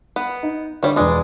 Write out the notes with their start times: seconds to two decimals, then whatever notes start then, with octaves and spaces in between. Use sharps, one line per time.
0.16 B3
0.43 D#4
0.83 D3 D#3 G3 C#5
0.96 E1 G#3 B4 D5 D#6